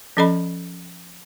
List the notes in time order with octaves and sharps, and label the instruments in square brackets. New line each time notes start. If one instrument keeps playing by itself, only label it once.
[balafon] F3 C#4 A4 D#5 B5